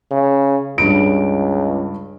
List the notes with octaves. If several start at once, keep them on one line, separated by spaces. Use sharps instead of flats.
C#3
C#2 G2 D7